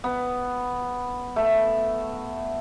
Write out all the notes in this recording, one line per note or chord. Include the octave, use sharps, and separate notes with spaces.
B3
A3